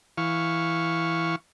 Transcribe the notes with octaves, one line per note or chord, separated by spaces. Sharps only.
E3 F5 C#6